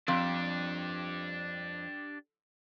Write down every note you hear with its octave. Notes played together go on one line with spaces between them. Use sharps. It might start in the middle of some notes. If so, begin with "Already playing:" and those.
F2 D4 G4